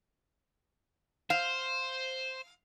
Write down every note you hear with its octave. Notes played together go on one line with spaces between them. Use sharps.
C5 F5